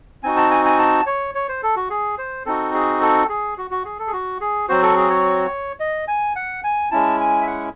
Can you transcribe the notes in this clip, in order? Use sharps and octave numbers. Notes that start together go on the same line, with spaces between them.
C4 D#4 F#4 G#5
A5
G#5
G#5
A5
C#5
C#5
C5
A4
F#4
G#4
C5
C4 D#4 F#4 A4
G#4
A4
G#4
F#4
F#4
G#4
A4
G#4
F#4
G#4
F#3 C4 F#4 C5
A4
G#4
C#5
D#5
G#5
F#5
G#5
G#3 C#4 E4 A5
G#5
E5
F#5